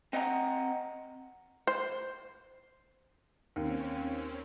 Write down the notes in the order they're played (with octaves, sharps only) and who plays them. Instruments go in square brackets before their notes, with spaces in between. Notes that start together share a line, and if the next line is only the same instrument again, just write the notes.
[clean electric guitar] C4 D#5 F#5 A#5
[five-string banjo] C5
[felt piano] D#2 [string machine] C4 C#4